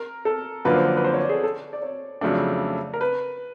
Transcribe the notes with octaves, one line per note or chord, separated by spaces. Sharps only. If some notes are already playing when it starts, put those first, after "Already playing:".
Already playing: A#4
A4
F#2 D3 F3 A#3 D4 B4
C5
B4
B4
C5
C#5
D5
G#4
A4
A4
D5
C#5
F2 C#3 F#3 A3 D4
A#4
B4